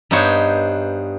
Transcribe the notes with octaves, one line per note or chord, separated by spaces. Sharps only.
G2 B3 D#4 C5 C#5